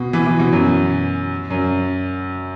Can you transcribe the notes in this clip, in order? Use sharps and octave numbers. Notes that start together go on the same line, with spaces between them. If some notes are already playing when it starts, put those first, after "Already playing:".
Already playing: B2
E3
E3
B2
F#2
F#2